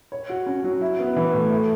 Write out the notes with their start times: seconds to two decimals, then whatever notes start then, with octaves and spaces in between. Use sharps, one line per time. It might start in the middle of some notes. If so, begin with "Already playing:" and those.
0.12 C#5
0.30 F#4
0.46 C#4
0.64 F#3
0.81 E4
0.99 B3
1.16 E3
1.33 A2
1.51 A3